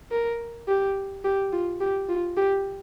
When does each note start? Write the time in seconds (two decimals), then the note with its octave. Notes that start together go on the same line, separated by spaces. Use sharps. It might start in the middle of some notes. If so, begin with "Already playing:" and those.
0.12 A#4
0.68 G4
1.25 G4
1.53 F4
1.81 G4
2.09 F4
2.37 G4